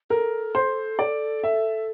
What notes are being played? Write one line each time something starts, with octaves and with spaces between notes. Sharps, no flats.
A4 A#4
C5
D5
E5